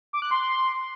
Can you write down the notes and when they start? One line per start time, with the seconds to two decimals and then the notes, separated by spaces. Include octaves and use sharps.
0.13 D6
0.22 F#6
0.31 C6